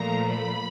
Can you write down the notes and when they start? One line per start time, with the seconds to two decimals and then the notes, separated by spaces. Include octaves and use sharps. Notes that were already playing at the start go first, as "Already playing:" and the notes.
Already playing: A#2 F3 A3 A#5
0.32 B5